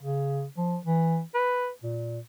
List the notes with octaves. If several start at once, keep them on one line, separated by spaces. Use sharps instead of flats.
C#3
F3
E3
B4
A#2